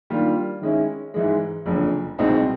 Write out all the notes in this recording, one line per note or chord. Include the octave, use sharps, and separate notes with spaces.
D#3 G3 A#3 D4 F4
D#3 G#3 C#4 E4
G#2 E3 G#3
F#1 F2 D3
C2 B2 G#3 C4 D#4